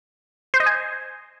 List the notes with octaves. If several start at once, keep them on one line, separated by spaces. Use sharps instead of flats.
C5
D#5
G#5